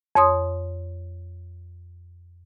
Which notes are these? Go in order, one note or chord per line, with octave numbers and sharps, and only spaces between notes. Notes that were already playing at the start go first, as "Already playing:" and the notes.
F2 C#5 C6 D#6